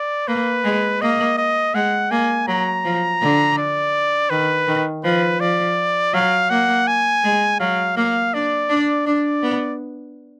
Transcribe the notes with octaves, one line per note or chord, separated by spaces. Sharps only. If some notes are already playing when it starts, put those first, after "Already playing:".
Already playing: D5
A#3 B4
G#3
A#3 D#5
D#5
G#3 F#5
A#3 G#5
F#3 A#5
F3
D3
D5
D#3 B4
D#3
F3 B4
F3 D5
F#3 F5
A#3 F#5
G#5
G#3
F#3 F5
A#3 F5
D4 D5
D4
D4 D5
B3